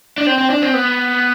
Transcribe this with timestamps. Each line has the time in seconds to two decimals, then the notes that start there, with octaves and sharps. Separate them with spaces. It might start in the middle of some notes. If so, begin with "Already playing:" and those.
0.18 D4
0.27 C4
0.38 C4
0.50 D4
0.62 C4
0.74 B3